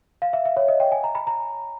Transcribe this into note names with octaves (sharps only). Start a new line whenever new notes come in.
F5
E5
E5
C#5
D#5
G5
G#5
A#5
B5
A#5